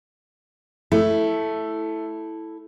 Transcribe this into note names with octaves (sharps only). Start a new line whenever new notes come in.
A3 E4 A4